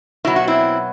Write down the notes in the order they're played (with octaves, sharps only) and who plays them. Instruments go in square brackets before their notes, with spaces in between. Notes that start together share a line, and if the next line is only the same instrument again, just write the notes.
[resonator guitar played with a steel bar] B2 F#3 E4
F#4
C4 E4